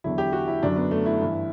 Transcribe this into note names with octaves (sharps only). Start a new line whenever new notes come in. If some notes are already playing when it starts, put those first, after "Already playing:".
E2 D3 F#3 E4
G4
F#4
E4
F#2 D3 F#3 D4
B3
A3
E4
G2 E3